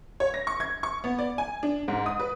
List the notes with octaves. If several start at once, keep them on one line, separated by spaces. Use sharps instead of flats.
C#5
A#6
C#6
G#6
C#6
B3
D5
G#5
D4
G#2
D#6
B4